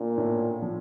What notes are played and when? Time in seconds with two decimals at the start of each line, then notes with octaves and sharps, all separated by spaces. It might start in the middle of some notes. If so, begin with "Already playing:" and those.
Already playing: A#2 D4
0.18 A2
0.62 F3